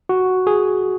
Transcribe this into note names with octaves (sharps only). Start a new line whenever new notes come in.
F#4
G#4